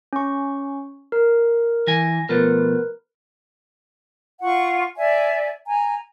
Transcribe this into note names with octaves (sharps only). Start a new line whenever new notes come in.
C#4 C#6
A#4
E3 G#5 A#6
B2 F3 A3 A#4 B4
F4 F#5 C#6
D5 E5 G#5
G#5 A#5